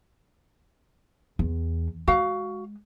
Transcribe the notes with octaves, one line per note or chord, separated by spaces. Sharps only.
E2
G#3 F#4 F5